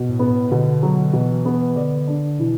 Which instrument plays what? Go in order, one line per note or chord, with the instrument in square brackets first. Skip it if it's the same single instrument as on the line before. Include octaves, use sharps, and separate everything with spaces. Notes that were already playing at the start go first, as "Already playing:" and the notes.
Already playing: [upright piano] B2
[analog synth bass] A2
[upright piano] B3
[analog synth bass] A2
[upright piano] B2 [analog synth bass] D3
[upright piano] F#3
[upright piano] B2 [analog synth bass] E3
[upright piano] B3
[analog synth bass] D3 [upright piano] D5
[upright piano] D4
[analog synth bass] B2 [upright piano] E3